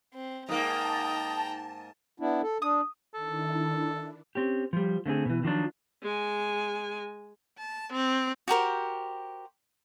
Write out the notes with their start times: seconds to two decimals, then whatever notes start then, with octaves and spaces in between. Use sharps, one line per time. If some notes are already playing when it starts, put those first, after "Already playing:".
0.13 C4
0.49 G#2 A#3 G5 A5 A#5 D#6
2.20 B3 D4 E4
2.43 A4
2.62 D4 D#6
3.14 D#3 D4 E4 A4
4.35 C4 C#4 G4
4.73 F3 G3
5.06 D3 A3 C4 G#4
5.25 B2 E3
5.43 D#3 F3 F#3 D4
6.02 G#3 G#5
7.58 A5
7.93 C4
8.48 F#4 G4 A#4 C5